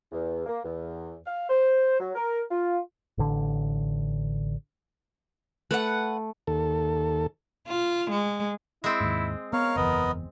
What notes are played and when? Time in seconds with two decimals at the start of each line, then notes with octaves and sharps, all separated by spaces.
0.12 E2
0.46 A#3
0.65 E2
1.26 F5
1.50 C5
2.00 F#3
2.15 A#4
2.51 F4
3.18 A1 D3
5.71 A3 B4 F#5
6.47 D#2 A4
7.68 F4
8.10 G#3
8.84 G#3 C4 E4
9.01 D#2 G#2
9.53 B3 A#4 C#5 F5
9.76 F#1 E2 B3 D#5